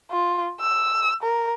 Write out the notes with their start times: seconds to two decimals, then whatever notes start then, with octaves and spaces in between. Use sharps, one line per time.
0.10 F4
0.60 E6
1.22 A#4